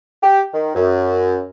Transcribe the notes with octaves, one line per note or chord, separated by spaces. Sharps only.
G4
D#3
F#2